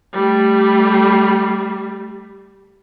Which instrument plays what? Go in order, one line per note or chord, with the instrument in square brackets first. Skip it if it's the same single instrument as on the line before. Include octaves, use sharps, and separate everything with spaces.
[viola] G3 A3